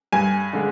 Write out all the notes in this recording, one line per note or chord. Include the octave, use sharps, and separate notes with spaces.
G2 G#5
D3 G#3